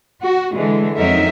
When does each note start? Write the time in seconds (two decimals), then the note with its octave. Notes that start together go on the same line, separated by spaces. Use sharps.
0.22 F#4
0.55 D3 E3 G#3
0.96 F2 F#3 D#4 A#4 E5